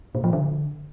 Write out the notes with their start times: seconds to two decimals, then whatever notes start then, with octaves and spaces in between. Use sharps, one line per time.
0.15 A#2
0.24 F3
0.33 D3